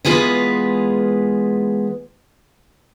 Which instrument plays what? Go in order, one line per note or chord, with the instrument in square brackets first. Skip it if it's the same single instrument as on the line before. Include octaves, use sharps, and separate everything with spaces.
[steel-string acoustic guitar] E3 G#3 B3 F4 G#4 B4